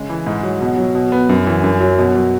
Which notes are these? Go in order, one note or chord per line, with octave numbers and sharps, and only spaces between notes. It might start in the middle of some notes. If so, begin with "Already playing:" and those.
Already playing: C#3 G#3
E3
G#2
F#3
B2
F#3
B2
B3
F#2
E3
F#2
F#3
B2
F#3